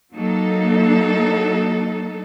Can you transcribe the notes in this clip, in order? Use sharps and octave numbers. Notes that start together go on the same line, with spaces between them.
F#3 A#3 D#4 A4